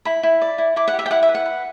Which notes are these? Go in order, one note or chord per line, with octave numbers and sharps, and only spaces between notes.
E4 B5
E4
D5
E4
E4 D6
F#5
G4
E5
G5
E4 F#5
E5
B4
F#5
B4